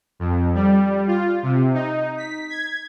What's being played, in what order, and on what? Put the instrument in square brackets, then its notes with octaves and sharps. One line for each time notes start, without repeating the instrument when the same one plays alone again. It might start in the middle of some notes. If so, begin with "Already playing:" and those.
[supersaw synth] F2
G3
F4
C3
D#4
B6
G#6